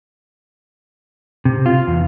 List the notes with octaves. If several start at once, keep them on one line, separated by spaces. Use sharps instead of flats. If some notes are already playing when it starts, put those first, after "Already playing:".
C3
F4
E2